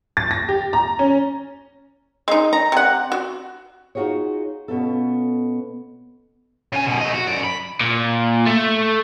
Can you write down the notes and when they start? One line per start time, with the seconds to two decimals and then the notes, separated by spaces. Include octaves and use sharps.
0.17 A6
0.31 A#6
0.49 G4
0.73 A#5
0.99 C#4
2.28 G#3 D#4
2.53 A#5
2.72 C3 F#5
3.12 F#4
3.95 D#4 F4 F#4 G#4 C#5
4.68 B2 B3 C#4 F4 A4
6.73 C#3 G#5
6.87 F#2 B2
7.01 A3 D#5
7.14 F#4
7.27 F#2 D5
7.44 B5
7.81 A#2
8.46 A3